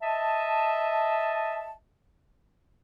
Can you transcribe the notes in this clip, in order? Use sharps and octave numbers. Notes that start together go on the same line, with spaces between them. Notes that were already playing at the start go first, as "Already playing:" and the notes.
D#5 E5 A5